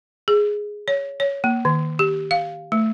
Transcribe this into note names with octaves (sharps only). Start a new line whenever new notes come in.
G#4
C#5
C#5
A#3
D#3
G4
F5
A3